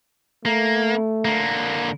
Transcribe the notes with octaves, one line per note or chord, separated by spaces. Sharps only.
A3 A#3
D3 A#3